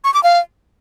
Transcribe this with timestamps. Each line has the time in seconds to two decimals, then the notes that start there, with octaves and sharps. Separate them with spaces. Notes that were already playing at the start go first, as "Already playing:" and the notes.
0.04 C#6
0.14 D6
0.23 F5